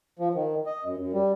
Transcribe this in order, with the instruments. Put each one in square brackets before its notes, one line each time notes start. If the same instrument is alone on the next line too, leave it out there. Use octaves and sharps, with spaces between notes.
[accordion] F3
D#3
D#5
F#2
F#2
G3